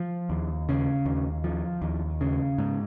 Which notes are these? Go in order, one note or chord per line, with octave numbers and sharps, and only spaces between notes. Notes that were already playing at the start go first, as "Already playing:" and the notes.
Already playing: F3
D#2
C#3
D#2
F3
D#2
C#3
G#2